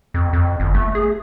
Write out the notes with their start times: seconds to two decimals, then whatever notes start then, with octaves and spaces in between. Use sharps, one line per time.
0.14 F2
0.33 F2
0.60 G1
0.74 A3
0.95 G#4